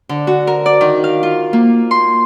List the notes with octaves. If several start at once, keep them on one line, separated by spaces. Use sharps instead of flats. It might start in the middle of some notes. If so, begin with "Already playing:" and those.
D3
F#4
A#4
D5
D#3
F5
F4
A#3
C6